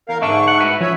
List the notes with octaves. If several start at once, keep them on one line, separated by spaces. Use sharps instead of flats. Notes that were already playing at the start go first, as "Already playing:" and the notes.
E2 A#4 F5
G#2 D3 D4 A4 E5 C#6
F#5
E4 F#4 B4
F3 C#4 C#5 E5